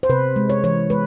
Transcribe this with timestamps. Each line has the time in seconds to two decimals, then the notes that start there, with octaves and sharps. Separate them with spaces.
0.03 C5
0.09 C3 B4
0.36 G#3
0.50 C#5
0.64 E3 C#5
0.90 G#3 B4